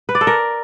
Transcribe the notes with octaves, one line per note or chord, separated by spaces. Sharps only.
B4
D5
A4
A#4